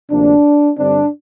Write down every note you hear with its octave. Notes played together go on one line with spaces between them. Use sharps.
D2 C3 F3 A#3 D4
G2 D3 G3 C4 D4